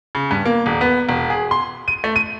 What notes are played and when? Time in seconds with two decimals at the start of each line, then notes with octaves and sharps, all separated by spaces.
0.15 C#3
0.31 G2
0.46 A#3
0.66 D#1
0.81 B3
1.09 E1
1.30 G#4
1.51 C6
1.88 D#7
2.04 A3
2.16 D#7